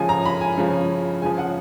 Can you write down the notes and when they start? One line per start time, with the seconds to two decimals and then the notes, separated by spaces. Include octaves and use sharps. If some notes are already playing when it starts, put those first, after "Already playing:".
Already playing: C#3 F3 G#5
0.09 A#5
0.26 B5
0.41 G#5
0.58 C#3 F3
1.22 C#3 F3 G#5
1.38 F#5